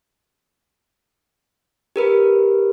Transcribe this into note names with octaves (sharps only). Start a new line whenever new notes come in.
G4 A#4 B4